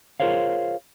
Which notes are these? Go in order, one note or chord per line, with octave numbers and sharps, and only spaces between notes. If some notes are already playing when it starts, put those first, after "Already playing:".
F4 G#4 A#4 C5 C#5 F5